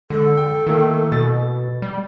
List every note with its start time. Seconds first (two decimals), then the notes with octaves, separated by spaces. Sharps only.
0.10 D3 G#3 A4
0.37 G5
0.67 D#3 A3 A#3 E4
1.12 B2 A6
1.82 G3